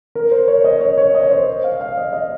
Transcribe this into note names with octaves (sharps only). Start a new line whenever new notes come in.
A#4
C5
C#5
D#5
C#5
C#5
D#5
C#5
C5
F5
F5
D#5
D#5